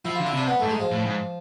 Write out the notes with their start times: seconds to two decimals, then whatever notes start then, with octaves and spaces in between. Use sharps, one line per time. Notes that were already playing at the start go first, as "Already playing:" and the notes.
0.05 F3 E4
0.15 D3 F4
0.26 E4
0.33 C3 D4
0.47 B3
0.59 G#2 A3
0.69 G#3
0.80 F3
0.91 A2
1.05 G#2